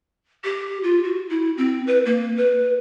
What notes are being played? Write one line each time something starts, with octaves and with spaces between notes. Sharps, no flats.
G4
F4
F#4
E4
C4
B4
A#3
B4